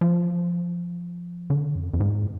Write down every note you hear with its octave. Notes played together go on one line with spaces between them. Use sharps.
F3
D3
F2
F2
G#2